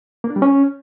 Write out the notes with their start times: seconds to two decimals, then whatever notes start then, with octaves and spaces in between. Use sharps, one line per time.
0.24 A#3
0.30 D4
0.36 G3
0.42 C#4